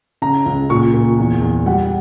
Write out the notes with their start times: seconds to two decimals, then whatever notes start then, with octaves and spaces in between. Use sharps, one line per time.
0.22 C#3 A#5
0.46 C#2
0.69 A#2 C#6
0.94 A#2
1.18 E2
1.41 E2
1.66 G3 F#5